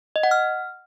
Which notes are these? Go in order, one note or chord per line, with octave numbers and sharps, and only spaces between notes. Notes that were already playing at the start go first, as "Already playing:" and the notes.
D#5
F#5
F6